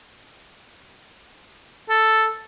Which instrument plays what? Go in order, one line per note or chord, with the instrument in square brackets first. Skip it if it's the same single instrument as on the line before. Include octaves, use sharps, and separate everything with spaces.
[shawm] A4